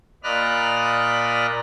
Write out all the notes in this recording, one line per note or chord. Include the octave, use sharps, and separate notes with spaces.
A#2 D5 D#5 B5 F6 F#6